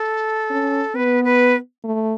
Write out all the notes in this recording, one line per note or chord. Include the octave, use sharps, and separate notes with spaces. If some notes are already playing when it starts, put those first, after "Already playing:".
Already playing: A4
C#4
B3 B4
B4
A3